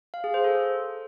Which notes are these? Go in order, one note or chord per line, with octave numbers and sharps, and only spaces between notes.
F5
G#4
C5
A4